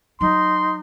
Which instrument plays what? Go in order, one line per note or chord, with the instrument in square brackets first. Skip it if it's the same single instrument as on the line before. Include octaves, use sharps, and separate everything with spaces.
[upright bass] F#3 [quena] D#4 [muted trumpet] C6